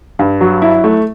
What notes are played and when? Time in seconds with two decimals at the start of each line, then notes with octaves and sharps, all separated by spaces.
0.19 G2
0.41 F#3
0.62 E4
0.84 A3